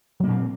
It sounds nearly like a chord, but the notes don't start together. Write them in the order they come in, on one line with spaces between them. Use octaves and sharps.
F#3 A#3 A#2 C4